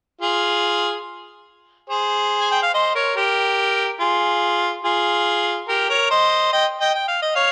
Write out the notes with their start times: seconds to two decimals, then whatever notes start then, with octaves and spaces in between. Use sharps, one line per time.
0.21 F4 G#4
1.90 G#4 C5
2.40 G#5
2.51 G5
2.63 F5
2.74 C5 D#5
2.95 A#4 C#5
3.16 G4 A#4
4.00 F4 G#4
4.84 F4 G#4
5.69 G4 A#4
5.89 A#4 C#5
6.10 C5 D#5
6.52 D#5 G5
6.80 D#5 G5
6.94 G5
7.08 F5
7.22 D#5
7.35 C#5 F5